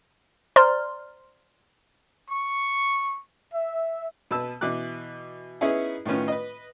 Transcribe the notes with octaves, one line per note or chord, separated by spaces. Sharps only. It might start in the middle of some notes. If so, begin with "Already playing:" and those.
C5 D5 A#5 C6 F6
C#6
E5
B2 B4 A5 E6
B2 E3 D6 F#6
B3 C#4 D#4 E4 G#4
A2 D#3 B3 C#4 F4
B4 D#5